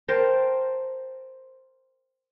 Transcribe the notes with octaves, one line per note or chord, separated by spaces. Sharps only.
A#4 C5 G5 A5